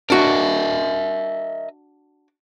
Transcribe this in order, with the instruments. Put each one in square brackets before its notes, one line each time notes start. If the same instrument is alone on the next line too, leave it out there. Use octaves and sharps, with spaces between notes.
[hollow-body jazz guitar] D4 F#4 [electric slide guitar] A#4 D#5 E5